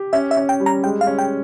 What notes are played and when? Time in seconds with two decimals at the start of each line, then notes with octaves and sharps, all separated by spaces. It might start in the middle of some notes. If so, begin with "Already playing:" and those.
Already playing: G4
0.13 C#4 E5
0.31 E5
0.37 C#4
0.49 G5
0.60 G3
0.66 A#5
0.83 G#3 G5
1.01 F5
1.07 C#4
1.19 G5